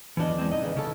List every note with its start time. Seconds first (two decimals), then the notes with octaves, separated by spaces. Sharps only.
0.17 E2 E3 F3 D4 D#5
0.38 G#3 C4
0.52 D3 D#4 D#5
0.63 C#3 E3
0.77 C#3 C#4 A4